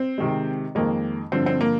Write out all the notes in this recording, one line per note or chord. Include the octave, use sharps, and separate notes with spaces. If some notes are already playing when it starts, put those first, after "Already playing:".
Already playing: C4
C3 D#3 G#3
F2 D#3 G#3 A#3
G2 D3 F3 C4
C4
A#3